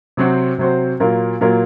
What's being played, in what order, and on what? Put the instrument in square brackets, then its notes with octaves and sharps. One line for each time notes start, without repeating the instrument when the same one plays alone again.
[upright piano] C3 F#3 C4 F#4 C5
C3 F#3 C4 F#4 C5
A#2 F#3 A#3 F4 A#4
A#2 F#3 A#3 F4 A#4